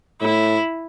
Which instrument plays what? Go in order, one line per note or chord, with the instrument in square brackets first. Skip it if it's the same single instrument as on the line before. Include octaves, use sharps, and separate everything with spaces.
[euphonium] A2 [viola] E4